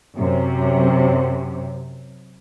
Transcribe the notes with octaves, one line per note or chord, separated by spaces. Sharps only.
F#2 C3